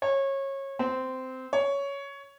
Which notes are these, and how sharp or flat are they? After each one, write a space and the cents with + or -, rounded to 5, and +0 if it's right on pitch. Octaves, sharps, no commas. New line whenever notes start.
C#5 -25
C4 -15
C#5 +10